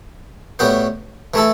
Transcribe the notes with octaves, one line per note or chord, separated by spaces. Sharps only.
A2 G3 B3 F#4 C5
E3 A3 E4 A4